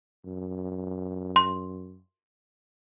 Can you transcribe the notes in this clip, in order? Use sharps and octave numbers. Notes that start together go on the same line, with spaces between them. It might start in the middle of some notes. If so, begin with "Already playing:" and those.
F#2
C6